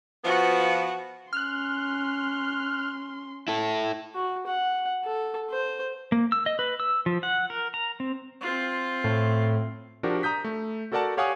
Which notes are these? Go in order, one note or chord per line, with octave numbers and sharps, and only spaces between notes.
F3 B3 F#4
C#4 C6 F6 F#6
E4 A4
F#4
F#5
A4
C5
A#3
E6
D#5
B4
E6
F3
F#5
A#4
A#5
C4
C4 F4
A2
F3 D4 F#4 G4 A#4
A#5 D#6 G6 B6
A3
F#4 A4 A#4 D5 F#5 A5
G4 C#5 F5 F#5 G#5 D#6